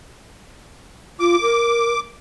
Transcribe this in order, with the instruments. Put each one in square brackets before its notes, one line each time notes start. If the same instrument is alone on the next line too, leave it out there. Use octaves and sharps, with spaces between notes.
[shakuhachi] F4 [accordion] D6
[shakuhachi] A#4